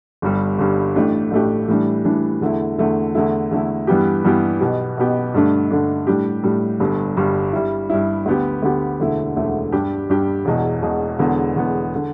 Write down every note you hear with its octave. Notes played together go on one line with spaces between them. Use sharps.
G1 G2 G3
G1 G2 G3
A1 A2 A3 D4 G4
A1 A2 A3 D4 G4
A2 E3 G3 D4
A2 E3 G3 D4
E2 D3 A3 E4
E2 D3 A3 E4
E2 D3 A3 E4
E2 D3 A3 E4
G2 E3 G3 B3 G4
G2 E3 G3 B3 G4
B1 B2 B3 G4
B1 B2 B3 G4
G2 D3 A3 D4
G2 D3 A3 D4
A2 G3 D4 G4
A2 G3 D4 G4
G1 G2 G3
G1 G2 G3
G2 G3 E4
G2 G3 E4
D2 D3 B3 G4
D2 D3 B3 G4
E1 D2 D3 A3 E4
E1 D2 D3 A3 E4
G2 G3 D4 G4
G2 G3 D4 G4
E1 E2 B2
E1 E2 B2
E1 E2 D3 B3
E1 E2 D3 B3
D3